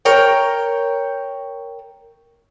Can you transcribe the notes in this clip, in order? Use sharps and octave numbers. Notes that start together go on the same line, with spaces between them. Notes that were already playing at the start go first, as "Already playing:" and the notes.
A#4 C#5 G5